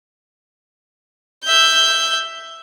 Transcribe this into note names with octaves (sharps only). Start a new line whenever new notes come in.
E5 G6